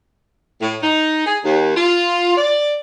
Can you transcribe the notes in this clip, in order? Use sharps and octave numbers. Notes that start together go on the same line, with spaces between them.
A2
D#4
G#4
D#2
F4
D5